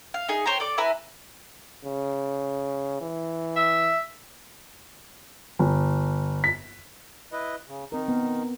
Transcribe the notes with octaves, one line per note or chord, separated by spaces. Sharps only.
F5
D#4 G#4
C5 C#5 G5 A#5
A4 D5 D6
E4 B4 G#5 A#5
C#3
E3
E5
G1
B6
E4 B4 D#5
C#3
D#3 C4 D#4 A#4
B3